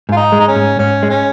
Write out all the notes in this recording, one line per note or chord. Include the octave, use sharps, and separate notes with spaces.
G#2 F4
D#4
G#3
D#4
C#4
G#2
G#2 C#4
G#3
C#4